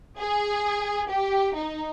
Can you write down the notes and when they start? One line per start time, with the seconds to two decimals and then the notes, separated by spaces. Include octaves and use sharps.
0.19 G#4
1.10 G4
1.55 D#4